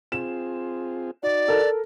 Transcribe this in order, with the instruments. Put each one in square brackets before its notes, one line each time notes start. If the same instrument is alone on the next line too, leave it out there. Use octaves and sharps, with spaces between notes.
[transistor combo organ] C4 F4 G#4 [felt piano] E7
[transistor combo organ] D#4 F#4 [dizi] D5
[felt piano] A4 A#4